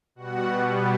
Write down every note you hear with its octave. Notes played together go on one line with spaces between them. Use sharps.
B2 G3 B3 F#4 F#5